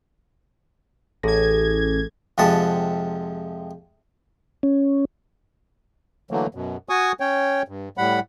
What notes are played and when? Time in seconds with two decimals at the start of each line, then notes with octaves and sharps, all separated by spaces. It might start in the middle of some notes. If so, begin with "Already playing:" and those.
1.23 A1 G#4 A4 G#6 A#6
2.38 F2 C3 F3 G#3 F#5 A5
4.63 C#4
6.31 D3 E3 F#3 A3 A#3
6.55 F#2 B2
6.89 F#4 G#5 C#6 D#6
7.20 C#4 C#5 G5
7.68 G2
7.98 A2 G3 F#5 B5